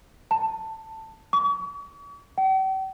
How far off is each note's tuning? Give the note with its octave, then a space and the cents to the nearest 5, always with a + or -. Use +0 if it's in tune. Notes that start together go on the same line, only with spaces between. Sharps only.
A5 +10
C#6 +45
G5 -45